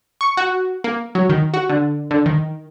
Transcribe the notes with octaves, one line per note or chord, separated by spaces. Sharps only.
C#6
F#4
A#3
F#3
D#3
F#4
D3
D3
D#3